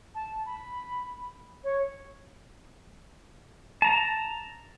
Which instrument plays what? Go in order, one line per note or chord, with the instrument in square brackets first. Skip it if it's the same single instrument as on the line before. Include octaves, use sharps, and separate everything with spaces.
[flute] A5
B5
C#5
[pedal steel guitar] A5 A#5